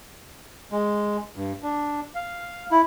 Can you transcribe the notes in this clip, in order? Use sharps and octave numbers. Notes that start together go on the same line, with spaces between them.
G#3
G2
D4
F5
E4